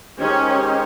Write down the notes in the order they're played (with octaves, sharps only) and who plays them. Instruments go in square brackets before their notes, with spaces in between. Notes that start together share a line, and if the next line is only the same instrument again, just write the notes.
[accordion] D#3 G#3 D#4 G4 C5 [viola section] C#4